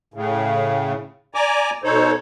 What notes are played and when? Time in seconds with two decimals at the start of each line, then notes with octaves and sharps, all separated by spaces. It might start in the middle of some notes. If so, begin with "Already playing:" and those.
0.14 A2 C#3
1.35 D5 G#5 A#5 D6
1.84 B2 D#4 A4 C5 C#5